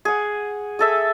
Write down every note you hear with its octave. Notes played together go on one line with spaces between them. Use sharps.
G#4 F#5
G#4 A4 E5